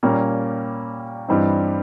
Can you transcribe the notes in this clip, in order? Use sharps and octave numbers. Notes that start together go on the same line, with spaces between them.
A#2 G3 A#3 C#4
G2 E3 G3 C4 D#4